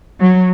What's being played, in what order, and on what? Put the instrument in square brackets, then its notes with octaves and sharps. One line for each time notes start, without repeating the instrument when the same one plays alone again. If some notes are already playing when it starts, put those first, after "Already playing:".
[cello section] F#3